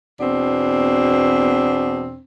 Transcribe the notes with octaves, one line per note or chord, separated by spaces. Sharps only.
E2 B2 C4 D4